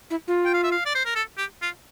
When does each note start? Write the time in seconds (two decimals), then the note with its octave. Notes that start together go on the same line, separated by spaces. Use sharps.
0.10 E4
0.28 F4
0.46 G5
0.54 F5
0.64 E5
0.72 F5
0.86 D5
0.95 C5
1.06 A#4
1.15 A4
1.38 G4
1.62 F4